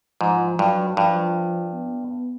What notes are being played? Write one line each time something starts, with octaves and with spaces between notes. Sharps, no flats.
G#2 F3
G2 F#3
G2 F3
B3